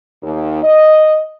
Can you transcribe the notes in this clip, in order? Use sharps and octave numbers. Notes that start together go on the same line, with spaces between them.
D#2
D#5